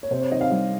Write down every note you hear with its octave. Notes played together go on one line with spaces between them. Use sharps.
C#5
C3 C5
C#5
D#3 D#5
F5
G3 F5